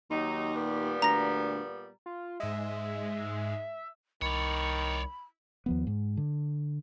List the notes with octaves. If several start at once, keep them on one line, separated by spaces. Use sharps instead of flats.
D#2 F#3 D#4
A#2 G3 B3
D2 A#5 A#6
F4
G#2 G#3 E5
C2 D#3 C#5 D5 B5
D#2 F3 B3
G#2
D3